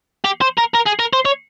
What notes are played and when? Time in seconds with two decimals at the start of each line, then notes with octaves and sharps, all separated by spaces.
0.25 G4
0.42 C5
0.58 A#4
0.75 A#4
0.87 G#4
1.00 A#4
1.13 C5
1.25 C#5